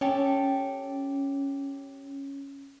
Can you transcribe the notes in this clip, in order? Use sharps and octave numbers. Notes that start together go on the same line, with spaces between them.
C#4 G4 A4